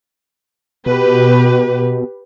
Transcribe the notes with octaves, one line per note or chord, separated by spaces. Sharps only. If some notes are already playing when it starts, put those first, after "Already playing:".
B2 G4 B4